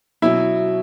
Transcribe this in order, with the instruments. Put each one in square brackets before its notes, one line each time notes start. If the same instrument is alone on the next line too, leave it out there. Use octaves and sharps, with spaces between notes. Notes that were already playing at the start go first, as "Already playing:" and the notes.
[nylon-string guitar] B2 F#3 C#4 [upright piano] E4